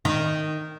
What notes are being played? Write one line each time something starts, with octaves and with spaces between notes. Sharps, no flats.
D#3